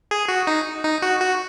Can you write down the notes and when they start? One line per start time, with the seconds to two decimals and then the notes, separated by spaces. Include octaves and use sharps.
0.11 G#4
0.29 F#4
0.47 D#4
0.84 D#4
1.02 F#4
1.21 F#4